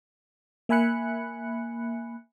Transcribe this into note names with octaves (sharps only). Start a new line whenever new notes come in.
A#3 E5 G#5 B5 F#6 C#7